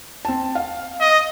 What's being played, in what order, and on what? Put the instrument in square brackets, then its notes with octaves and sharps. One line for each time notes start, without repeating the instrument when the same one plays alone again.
[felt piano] C4 A5
F5
[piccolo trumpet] D#5